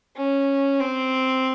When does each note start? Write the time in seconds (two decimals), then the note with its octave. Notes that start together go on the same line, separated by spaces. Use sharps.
0.16 C#4
0.80 C4